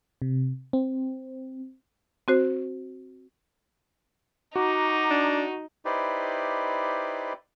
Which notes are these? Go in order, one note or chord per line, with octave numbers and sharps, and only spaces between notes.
C3
C4
C4 F#4 C5
D#4 F#4 A#5 D6
D4
D#4 E4 G4 B4 C5 D5